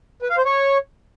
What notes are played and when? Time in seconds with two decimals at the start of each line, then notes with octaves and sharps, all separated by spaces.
0.22 B4
0.30 F5
0.38 C5
0.45 C#5